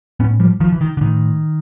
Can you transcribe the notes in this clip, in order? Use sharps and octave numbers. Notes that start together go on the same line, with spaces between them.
A2 B3 C#4
F3 G3
D#3 F3
E3
D#3
D3
A2 D#3